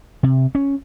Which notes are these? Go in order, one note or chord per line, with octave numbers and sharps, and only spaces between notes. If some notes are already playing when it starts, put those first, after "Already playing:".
C3
C#4